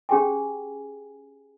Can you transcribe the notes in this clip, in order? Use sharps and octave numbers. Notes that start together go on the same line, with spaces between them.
C#4 G4 G#4 G5 G#5